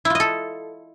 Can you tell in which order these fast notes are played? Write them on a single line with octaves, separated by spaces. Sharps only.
E4 F4 D#5 A4